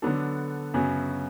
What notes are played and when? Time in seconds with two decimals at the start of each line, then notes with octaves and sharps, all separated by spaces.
0.02 D3 F#3 B3 D4 A4
0.74 F#2 C#3 F#3 B3